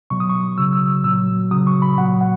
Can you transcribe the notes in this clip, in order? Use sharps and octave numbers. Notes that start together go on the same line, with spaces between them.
B2 F#3 C#6
D#6
C#6
C#3 F#3 E6
E6
A#2 F#3 E6
C#3 F#3 D#6
C#6
B5
A#2 F#3 F#5
F#5